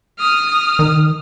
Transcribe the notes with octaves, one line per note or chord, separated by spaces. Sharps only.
D#6 F6
D#3